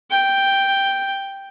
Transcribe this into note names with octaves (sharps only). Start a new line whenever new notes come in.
G5